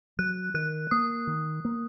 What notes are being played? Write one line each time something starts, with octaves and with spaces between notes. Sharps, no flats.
F#3 F#6
D#3 F#6
A#3 D#6
D#3
A#3